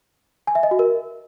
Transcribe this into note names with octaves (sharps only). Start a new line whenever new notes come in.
G#5
E5
D#5
F#4
A#4